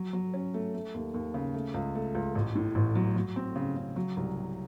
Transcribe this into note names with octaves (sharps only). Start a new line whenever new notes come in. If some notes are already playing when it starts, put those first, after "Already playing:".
Already playing: F#3
F#3
C#4
A3
A3
D#2
D#2
C#3
A3
C#2
A3
C#2
A1
A2
A1
F#3
F#3
C4
C#3
C#3
F#3
C2
C3